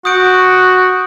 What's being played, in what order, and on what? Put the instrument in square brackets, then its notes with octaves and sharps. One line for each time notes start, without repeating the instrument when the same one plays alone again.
[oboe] F#4 [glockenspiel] D#6 G6 D7